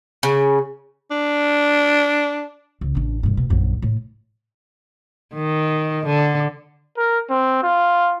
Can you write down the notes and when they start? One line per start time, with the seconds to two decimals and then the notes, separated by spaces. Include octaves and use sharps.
0.23 C#3
1.11 D4
2.81 C#2
2.95 A1 D4
3.23 G2 B2
3.37 B2
3.50 A#1 F#2
3.82 A2 E4
5.34 D#3
6.06 D3
6.97 A#4
7.30 C4
7.63 F4